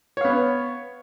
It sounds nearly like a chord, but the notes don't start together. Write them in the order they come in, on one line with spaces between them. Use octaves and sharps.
C#5 F5 B3